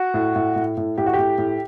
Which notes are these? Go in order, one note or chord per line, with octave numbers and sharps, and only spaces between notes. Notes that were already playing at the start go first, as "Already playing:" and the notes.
Already playing: F#4
A2
A2
A2
A2
A2 G4
F#4
A2 G4
A2